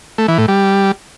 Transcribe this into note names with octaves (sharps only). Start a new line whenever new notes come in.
A3
E3
A2
G3